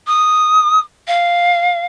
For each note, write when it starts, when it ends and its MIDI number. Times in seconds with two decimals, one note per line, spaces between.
0.07 0.80 87
1.08 1.86 77